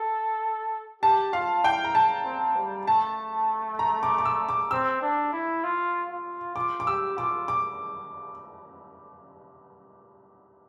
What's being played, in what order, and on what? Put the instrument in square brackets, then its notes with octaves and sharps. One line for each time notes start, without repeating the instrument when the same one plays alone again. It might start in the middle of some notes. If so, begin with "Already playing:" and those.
Already playing: [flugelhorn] A4
[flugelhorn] G4 [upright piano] A5
[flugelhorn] F4 [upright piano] F5
[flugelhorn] E4 [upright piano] G5
[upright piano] A#5
A5
[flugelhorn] C4
G3
[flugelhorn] A3 [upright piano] A5
[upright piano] A#5
D6
D6
E6
D6
[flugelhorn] C4 [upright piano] E6
[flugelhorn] D4
E4
F4
F4
[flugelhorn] F4 [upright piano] D6
[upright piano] D6
[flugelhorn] G4 [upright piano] E6
[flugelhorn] F4 [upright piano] D6
[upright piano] D6